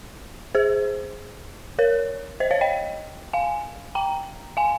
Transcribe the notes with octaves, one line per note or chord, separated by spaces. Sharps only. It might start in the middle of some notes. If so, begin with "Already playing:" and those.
G#4 C5
A#4 C#5
C5 D#5
C#5 F5
D#5 G5
F5 G#5
G5 A#5
F5 G#5